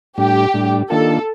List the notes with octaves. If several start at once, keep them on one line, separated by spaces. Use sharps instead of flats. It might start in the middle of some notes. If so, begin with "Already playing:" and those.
A2 G3 D4 G4
A2 G3 D4
D#3 A#3 D4 F4 A4